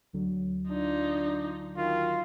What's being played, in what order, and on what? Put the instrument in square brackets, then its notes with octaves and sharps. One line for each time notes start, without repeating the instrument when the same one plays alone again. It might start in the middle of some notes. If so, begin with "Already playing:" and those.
[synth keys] D2 D3 F#3
[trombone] D4 [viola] D#4 F4
[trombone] D#3 [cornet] F4 [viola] F#4